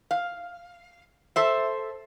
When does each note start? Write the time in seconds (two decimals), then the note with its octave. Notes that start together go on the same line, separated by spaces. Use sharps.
0.11 F5
1.36 A4 C5 E5